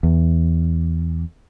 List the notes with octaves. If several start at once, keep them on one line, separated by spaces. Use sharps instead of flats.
E2